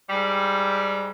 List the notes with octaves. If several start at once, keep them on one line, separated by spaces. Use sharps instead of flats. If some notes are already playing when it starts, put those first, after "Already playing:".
G#2 G3